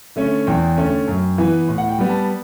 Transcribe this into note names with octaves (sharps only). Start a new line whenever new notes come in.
D3 A3 C#4
E2 G5
D3 A3 C#4
F#2
E3 B3
A2
F#5
G5
G3 B3
A5